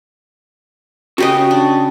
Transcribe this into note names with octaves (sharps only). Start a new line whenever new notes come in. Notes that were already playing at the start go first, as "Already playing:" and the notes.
C#3 F#4 G4 D#5
D4